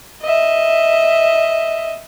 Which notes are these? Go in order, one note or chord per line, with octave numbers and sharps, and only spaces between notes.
D#5 E5